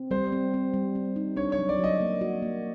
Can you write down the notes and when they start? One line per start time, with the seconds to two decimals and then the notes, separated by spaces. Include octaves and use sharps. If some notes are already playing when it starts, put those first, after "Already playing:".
Already playing: C4
0.11 G3 C5
0.32 C4
0.54 C4
0.74 G3
0.95 C4
1.16 D#4
1.36 D4 C#5
1.52 C#5
1.59 F#3
1.69 D5
1.79 F#3
1.84 D#5
2.01 A#3
2.21 F#4
2.42 A#3